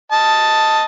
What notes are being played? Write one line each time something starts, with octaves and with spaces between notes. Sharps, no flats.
D#5 A5